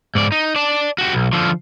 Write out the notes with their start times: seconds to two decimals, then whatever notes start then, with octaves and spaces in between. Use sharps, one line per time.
0.15 G#2 D5
0.32 D#4
0.56 D5 A5
0.98 F#4 G4
1.13 B1
1.33 D3 F3